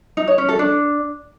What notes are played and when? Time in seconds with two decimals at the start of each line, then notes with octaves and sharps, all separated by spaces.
0.17 D#4
0.28 C#5
0.38 C#4
0.49 A4
0.59 D4